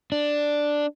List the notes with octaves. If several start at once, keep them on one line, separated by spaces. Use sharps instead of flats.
D4